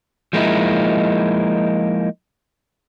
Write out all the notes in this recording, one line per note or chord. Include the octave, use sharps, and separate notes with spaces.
F3 G#3 A#3 D#4 E4